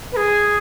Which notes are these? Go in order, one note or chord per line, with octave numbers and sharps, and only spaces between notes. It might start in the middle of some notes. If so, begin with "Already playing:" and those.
B4
G#4